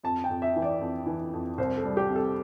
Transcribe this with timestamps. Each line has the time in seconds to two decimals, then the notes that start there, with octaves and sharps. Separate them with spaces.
0.04 F2 A5
0.24 G5
0.30 F2
0.42 E5
0.56 E3
0.62 D5
0.81 F2
1.06 E3
1.33 F2
1.58 C2 C5
1.77 A4
1.84 G3
1.97 G4
2.10 C3
2.16 A4